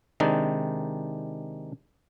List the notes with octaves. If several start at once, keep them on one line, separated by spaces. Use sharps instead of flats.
C3 D#3 G#3 D4 D#4 D5